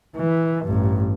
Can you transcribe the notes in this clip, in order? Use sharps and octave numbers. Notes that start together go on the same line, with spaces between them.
E3
A1 G2